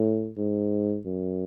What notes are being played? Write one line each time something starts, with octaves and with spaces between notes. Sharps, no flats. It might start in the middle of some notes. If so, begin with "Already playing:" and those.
Already playing: A2
G#2
F#2